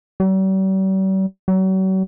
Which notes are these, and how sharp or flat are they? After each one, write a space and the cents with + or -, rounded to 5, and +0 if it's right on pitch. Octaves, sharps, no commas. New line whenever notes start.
G3 -45
F#3 +40